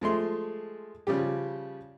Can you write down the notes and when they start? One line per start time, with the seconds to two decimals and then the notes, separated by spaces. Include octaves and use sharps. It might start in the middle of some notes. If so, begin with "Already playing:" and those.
0.01 F3 G#3 A3 C6
1.07 C#3 F3 G3 G4